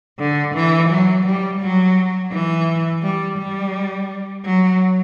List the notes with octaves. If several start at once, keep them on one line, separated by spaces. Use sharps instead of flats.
D3
E3
F#3
G3
F#3
E3
G3
G3
F#3